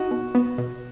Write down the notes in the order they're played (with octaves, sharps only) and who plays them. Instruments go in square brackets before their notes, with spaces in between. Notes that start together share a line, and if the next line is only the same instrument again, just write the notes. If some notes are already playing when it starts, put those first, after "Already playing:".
Already playing: [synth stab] D#4 [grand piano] F#4
[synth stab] B2
B3
B2